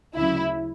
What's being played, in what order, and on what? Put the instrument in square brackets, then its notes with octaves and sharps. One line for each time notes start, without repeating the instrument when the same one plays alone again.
[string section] D2 C#3 F#3 E4